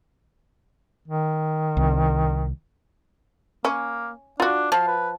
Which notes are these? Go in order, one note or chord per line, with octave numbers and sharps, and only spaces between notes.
D#3
C2
A#3 C#4
D4 F4 F#4
F3 F5
B4